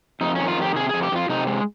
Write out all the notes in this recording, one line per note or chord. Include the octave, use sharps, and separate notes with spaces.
F2 D#4
D#3 C#4
F4
F2 G4
C3 G#4
G#4
F2
G4
F2 F4
C3 D#4
G#3